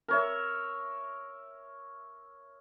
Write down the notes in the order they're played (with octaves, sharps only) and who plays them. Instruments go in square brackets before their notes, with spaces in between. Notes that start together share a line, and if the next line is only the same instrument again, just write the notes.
[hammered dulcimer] A#4 C#5 E5